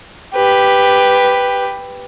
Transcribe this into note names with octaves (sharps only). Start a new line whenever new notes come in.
G4 B4